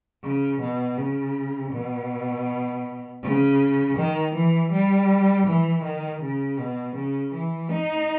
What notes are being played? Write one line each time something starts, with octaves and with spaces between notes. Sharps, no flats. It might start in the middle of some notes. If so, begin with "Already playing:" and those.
C#3
B2
C#3
B2
C#3
D#3
E3
G3
E3
D#3
C#3
B2
C#3
E3
D#4